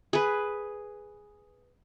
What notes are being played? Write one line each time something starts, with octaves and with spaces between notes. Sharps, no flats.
G#4 B4